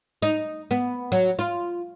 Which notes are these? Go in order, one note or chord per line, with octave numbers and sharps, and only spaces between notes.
D#4
B3
F#3
F4